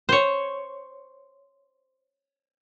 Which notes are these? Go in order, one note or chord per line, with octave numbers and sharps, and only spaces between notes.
C5 C#5